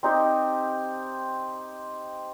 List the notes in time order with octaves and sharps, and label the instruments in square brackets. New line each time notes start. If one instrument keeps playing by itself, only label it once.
[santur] C4 D#4 G4 D#5